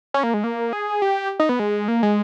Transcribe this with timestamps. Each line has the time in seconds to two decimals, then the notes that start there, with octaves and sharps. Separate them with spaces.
0.14 C#4
0.23 A#3
0.34 G#3
0.44 A#3
0.73 G#4
1.02 G4
1.40 D#4
1.49 B3
1.59 G#3
1.88 A#3
2.03 G#3